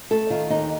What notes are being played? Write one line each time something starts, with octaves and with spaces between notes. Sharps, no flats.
A3 A4
D#3 F4
D#2 D#4